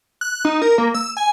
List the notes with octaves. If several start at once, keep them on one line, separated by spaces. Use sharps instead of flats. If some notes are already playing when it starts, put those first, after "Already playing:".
F#6
D#4
A#4
A#3
E6
G#5